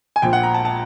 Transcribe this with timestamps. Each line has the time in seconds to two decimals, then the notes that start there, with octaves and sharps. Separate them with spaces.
0.16 G#5
0.22 A#1 A#2 F3 G5
0.33 F#5
0.43 A#5
0.54 A5
0.65 A5